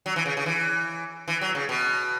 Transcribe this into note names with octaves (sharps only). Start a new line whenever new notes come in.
F#3
E3
C#3
C#3
E3
E3
F#3
C#3
B2